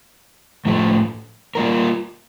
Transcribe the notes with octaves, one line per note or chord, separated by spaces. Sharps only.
A2 F3 A3
G3 A#3 F4 A#4